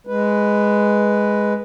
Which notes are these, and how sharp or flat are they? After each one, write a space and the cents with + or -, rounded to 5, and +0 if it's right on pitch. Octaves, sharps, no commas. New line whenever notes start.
G#3 +0 B4 +0